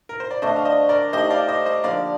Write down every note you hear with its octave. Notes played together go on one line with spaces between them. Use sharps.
A#4
C5
D5
D3 A3 D4 C5 D#5
F5
C5 D#5
A#4 D5
A3 D#4 G4 C5 D#5
D5 F5
C5 D#5
C5 D#5
D3 F3 A#3 D5 F5